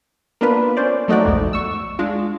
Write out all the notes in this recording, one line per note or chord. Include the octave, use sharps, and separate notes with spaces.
A#3 B3 D4 F4 B4
C#4 C5 D5
F#3 A3 D#4 F#4 D5
A#1 E2 G#2
C#6 E6
G#3 D4 F4